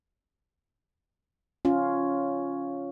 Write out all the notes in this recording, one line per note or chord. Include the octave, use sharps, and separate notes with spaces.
C#4 F4